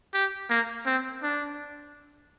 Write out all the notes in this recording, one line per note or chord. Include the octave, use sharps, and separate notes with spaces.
G4
A#3
C4
D4